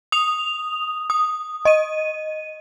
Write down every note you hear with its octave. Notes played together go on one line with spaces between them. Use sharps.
D#6 F7
D#6
D#5 D#7